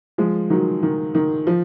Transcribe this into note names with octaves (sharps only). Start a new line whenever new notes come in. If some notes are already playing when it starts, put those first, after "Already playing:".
F3 G#3
D#3 F#3
D#3
D#3
F3